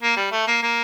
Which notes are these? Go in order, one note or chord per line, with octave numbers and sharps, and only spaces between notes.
A#3
G3
A3
A#3
A#3